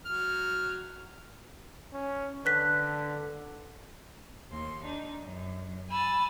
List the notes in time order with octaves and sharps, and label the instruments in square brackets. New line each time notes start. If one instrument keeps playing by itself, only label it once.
[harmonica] F#3 F6
[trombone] C#4
[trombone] D3 [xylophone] B4 F#6 B6
[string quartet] D#2 C6
D4 D#4
F#2
[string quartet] G#5 E6 A6 [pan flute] B5